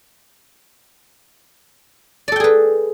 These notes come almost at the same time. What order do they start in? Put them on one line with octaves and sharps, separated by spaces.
D5 A4 G5 G#4 B4